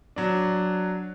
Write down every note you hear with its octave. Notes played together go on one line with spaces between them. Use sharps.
F#3 D4